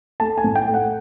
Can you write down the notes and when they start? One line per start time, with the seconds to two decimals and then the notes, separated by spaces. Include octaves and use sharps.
0.20 A3 A5
0.38 G#5
0.44 A2
0.56 G5
0.68 A3
0.74 F#5